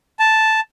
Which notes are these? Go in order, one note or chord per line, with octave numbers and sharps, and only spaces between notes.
A5